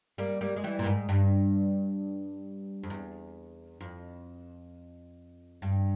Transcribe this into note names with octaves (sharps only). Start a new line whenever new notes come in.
G3 A#3
G3 A#3
G#3
E3 G3
A#2
G#2
G2
F2
E2
F2
G2